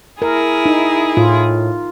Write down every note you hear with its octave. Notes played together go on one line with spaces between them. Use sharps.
E4 G#4 A#4
D#4
A2 F4